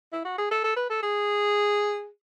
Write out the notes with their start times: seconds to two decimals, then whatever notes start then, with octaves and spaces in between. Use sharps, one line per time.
0.13 E4
0.25 F#4
0.38 G#4
0.51 A4
0.64 A4
0.76 B4
0.90 A4
1.03 G#4